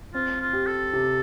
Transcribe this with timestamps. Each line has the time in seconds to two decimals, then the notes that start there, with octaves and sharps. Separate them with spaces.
0.14 C4 F4
0.41 F4
0.53 G4
0.67 A4
0.93 C3